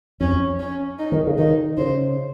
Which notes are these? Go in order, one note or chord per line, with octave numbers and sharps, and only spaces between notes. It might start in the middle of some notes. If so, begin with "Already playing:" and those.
F2 C#4
C#4
D#4
D#3
C#3
D#3 D#4
C#3 C5